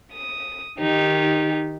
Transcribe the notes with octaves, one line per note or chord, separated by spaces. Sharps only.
D#6
D#3 D#4 G4